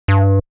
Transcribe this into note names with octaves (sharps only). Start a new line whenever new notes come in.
G2